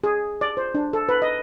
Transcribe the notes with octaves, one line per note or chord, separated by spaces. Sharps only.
G#4
D5
C5
D4
A4
B4
D#5